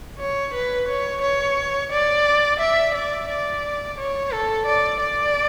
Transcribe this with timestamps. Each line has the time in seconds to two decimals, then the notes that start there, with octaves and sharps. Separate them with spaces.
0.18 C#5
0.54 B4
0.88 C#5
1.22 C#5
1.92 D5
2.60 E5
2.94 D5
3.29 D5
3.97 C#5
4.31 A4
4.66 D5
5.01 D5